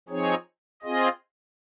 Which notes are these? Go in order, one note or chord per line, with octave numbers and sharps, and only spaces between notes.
F3 C4 D#4 G#4 C#5
C4 F4 G#4 D#5